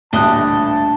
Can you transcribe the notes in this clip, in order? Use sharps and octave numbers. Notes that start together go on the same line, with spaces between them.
D#1 A1 D2 D4 D#5 A5 D#6 F#6